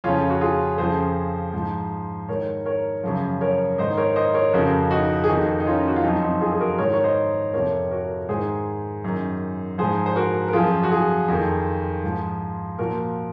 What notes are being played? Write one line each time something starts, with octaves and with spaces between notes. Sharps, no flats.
F2 C#3 F3 C#4 F4
F#4
F4 G#4
F2 C#3 F3 G#4 C5
G#2 F3
G#2 D#3 A#4 C#5
A#4 C#5
F#2 C#3 F3
A#4 C#5
G#2 D#3 C5 D#5
A#4 C#5
C5 D#5
A#4 C#5
F2 C#3 F3 F#4 A#4
D#4 F#4
G#4
F2 D#3 D#4 F#4
D#4
C#4 F4
F#4
F4
F#2 F3 C4 D#4
C4 D#4
F4 G#4
G#4
F#4 A#4
G#2 D#3 A#4 C#5
C#5
C5 D#5
F2 C3 F3 A#4 C#5
F#4 A#4
G#2 D#3 G#4 C5
F#2 D#3
G#2 F3 G#4 C5
C5
F#4 A#4
A#4
F#2 F3 F4 G#4
F#4
F4 G#4
F2 D#3
G#2 F3
A#2 F3 F#4 A#4